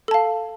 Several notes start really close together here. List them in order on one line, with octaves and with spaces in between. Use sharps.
A4 A5 F5